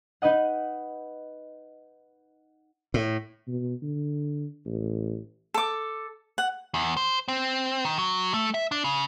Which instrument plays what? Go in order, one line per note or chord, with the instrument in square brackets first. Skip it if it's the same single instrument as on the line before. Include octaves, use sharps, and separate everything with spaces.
[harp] D#4 B4 D#5 F#5
[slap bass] A2
[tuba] B2
D3
A1
[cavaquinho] A4 D6
F#5
[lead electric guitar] E2
C5
C4
D#3
F#3
A3
E5
D4
C#3